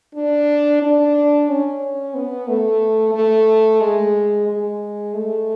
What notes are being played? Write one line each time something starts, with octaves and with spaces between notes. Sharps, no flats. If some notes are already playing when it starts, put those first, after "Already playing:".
D4
D4
C#4
B3
A3
A3
G#3
G#3
A3